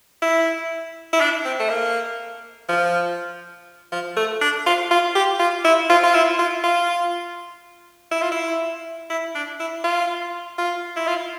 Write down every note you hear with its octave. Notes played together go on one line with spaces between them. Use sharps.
E4
E4
D4
C4
A3
A#3
F3
F3
A3
D4
F4
F4
G4
F4
E4
F4
F4
E4
F4
F4
E4
F4
E4
E4
D4
E4
F4
F4
E4
F4